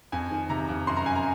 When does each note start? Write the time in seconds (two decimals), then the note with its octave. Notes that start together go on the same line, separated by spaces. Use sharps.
0.12 F2 G#5
0.31 D#3
0.49 C3 A#5
0.69 F2
0.87 F#2 C6
0.96 A#5
1.05 F#2 G#5
1.15 A#5